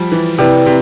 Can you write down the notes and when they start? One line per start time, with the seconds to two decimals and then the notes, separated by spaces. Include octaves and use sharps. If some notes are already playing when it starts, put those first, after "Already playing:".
Already playing: F3 G3
0.12 E3
0.38 C3 E4 B4 D5 G5
0.66 C3